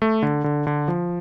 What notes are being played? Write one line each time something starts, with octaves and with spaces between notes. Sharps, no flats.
A3
D3
D3
D3
F3